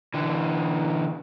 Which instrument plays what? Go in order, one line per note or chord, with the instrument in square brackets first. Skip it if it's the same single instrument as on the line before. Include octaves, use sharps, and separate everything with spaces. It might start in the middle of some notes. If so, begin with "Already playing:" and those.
[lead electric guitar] D3 E3